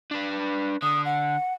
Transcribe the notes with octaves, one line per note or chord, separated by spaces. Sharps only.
D4 B4
D3 D#6
F#5